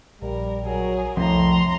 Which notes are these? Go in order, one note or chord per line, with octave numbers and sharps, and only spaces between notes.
A#1 G3 A#4
F#3 G#4 A#4
C2 F2 A2 A#5 C6